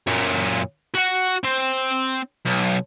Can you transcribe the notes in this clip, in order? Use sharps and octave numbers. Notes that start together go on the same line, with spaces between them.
F#2 A#2
F#4 F#5
C4
B1